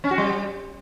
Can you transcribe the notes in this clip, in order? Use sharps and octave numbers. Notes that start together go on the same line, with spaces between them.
C#4
F#4
G3